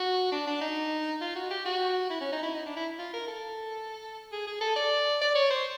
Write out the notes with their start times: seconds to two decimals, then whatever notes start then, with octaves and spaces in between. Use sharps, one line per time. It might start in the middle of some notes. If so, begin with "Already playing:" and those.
Already playing: F#4
0.32 D4
0.47 D4
0.61 D#4
1.21 F4
1.36 F#4
1.51 G4
1.66 F#4
2.10 E4
2.21 C#4
2.33 D#4
2.43 E4
2.55 D#4
2.66 D4
2.76 E4
2.99 F4
3.14 A#4
3.28 A4
4.32 G#4
4.47 G#4
4.61 A4
4.76 D5
5.21 D5
5.35 C#5
5.51 C5